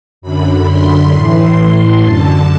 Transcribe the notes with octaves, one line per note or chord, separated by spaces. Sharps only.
F#2 D3 B5
C6
A2 E3
F#2 D3 A5